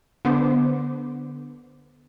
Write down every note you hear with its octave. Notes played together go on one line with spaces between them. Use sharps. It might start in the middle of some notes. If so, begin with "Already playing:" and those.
D3 B3 C5 D6